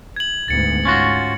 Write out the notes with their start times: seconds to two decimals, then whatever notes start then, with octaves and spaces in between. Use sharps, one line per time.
0.16 G#6 F#7
0.48 D2 G#2 B3 A6 C#7
0.85 G#2 C#4 F4 F#4